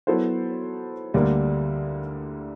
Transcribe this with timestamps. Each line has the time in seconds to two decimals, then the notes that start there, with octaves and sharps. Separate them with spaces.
0.07 F#3 B3 E4 A4 C5
1.14 D2 D3 G3 A#3